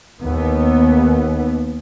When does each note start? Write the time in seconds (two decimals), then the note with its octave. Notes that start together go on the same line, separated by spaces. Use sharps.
0.20 D#2 B3